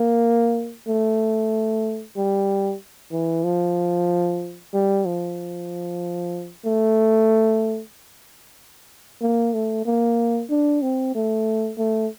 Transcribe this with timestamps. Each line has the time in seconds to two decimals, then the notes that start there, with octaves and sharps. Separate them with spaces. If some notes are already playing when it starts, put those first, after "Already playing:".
Already playing: A#3
0.88 A3
2.17 G3
3.12 E3
3.44 F3
4.73 G3
5.06 F3
6.66 A3
9.22 A#3
9.54 A3
9.86 A#3
10.50 D4
10.82 C4
11.15 A3
11.78 A3